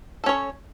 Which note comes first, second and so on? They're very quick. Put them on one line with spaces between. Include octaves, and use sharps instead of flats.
A4 C#4 C#5